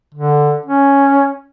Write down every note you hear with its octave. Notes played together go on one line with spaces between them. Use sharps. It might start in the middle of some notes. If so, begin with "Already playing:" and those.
D3
C#4